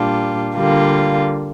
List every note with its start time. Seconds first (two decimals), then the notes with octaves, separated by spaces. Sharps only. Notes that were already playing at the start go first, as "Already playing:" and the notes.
Already playing: A#2 G3 D4 F4
0.56 D3 G3 A#3 F4